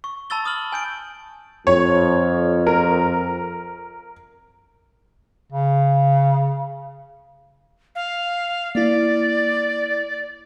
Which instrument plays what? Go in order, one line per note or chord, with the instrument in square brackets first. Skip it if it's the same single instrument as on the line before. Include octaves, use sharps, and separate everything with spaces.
[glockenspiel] C#6
A5 B5 E6 A6 G7
D#6 F6 F#7
G#5 G6 D7
[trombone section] F2 [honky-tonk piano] C#5
[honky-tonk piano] A#4
[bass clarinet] C#3
[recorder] F5
[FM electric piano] A#3 E4 [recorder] D5